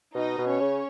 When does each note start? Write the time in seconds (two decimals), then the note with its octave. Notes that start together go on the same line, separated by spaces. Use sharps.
0.15 B2 D#4 D#5
0.38 B2
0.48 C#4 C#5
0.60 C#3